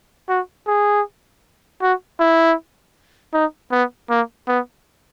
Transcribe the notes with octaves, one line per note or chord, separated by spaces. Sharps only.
F#4
G#4
F#4
E4
D#4
B3
A#3
B3